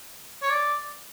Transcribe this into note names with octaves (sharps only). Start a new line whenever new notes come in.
C#5
D5